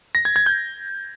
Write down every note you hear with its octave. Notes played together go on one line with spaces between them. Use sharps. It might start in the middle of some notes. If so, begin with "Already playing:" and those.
A#6
G#6
G#6
G6